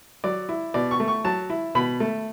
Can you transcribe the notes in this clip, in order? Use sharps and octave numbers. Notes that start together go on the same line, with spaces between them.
F#3 D5
E4
B2 D5
C#6
A3
C#6
F#3 A5
E4
B2 B5
A3